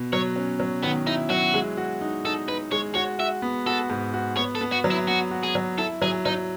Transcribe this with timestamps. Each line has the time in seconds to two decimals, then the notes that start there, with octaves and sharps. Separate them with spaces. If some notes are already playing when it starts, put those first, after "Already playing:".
Already playing: B2
0.13 F#3 C#5
0.36 C#4
0.60 F#3
0.83 D#3 B3
1.07 D#4 E4
1.30 F#3 F#4
1.54 G#3
1.77 F#4
2.01 D#4
2.25 D#4 A4
2.48 D#4 B4
2.72 G#3 C#5
2.95 F#4 C#5
3.19 F#4 E5
3.42 B3
3.66 F#4 A4
3.90 G#2
4.14 F#4
4.37 B3 C#5
4.55 A4
4.61 B3
4.72 F#4
4.84 F#3
4.90 E4
5.07 B3 F#4
5.31 F#4
5.43 G#4
5.55 F#3
5.78 E4 A4
6.02 F#3 G#4
6.25 F#3 D#4